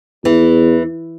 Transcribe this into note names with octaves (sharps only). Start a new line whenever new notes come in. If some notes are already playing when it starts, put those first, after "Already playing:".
E2 E3